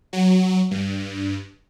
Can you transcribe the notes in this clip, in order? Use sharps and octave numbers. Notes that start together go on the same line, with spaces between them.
F#3
G2